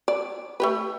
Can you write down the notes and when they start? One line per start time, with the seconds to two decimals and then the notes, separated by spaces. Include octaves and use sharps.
0.08 D5
0.60 A3 G4 B4